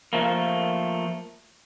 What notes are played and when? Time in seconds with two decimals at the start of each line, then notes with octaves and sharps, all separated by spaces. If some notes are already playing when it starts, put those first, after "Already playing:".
0.13 F3 A3 A#3